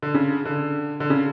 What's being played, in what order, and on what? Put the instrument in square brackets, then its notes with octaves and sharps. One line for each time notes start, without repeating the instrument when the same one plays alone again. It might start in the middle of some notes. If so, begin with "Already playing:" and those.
[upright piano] D3
C#3
D3
D3
C#3